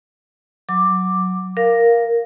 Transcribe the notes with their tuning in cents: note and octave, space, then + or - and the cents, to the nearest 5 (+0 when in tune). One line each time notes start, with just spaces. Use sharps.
F#3 +0 D6 +5
A#4 +0 F5 +0